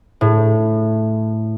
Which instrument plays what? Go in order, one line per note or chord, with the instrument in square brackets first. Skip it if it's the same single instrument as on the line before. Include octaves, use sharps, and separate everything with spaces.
[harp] A2